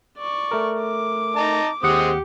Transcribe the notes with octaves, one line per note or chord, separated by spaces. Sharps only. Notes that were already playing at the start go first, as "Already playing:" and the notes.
D5 C#6
A3 A#4
D6
D#4 A5 A#5
D#2 G#3 C4 G4 F#5 D#6 C#7